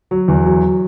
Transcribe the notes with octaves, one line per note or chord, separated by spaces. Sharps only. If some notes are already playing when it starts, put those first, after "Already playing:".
F#3
E2
F#3